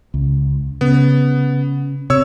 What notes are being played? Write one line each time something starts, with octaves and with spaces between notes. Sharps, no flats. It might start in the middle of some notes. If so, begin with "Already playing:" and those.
C#2
C#3 B3
C3 C#5 E6